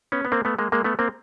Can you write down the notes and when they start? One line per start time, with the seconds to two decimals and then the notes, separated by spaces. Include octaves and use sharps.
0.12 B3 C#4
0.25 B3
0.32 A#3 C4
0.45 A3 B3
0.59 G#3 A#3
0.72 G#3 A#3
0.84 A3 B3
0.99 A#3 C4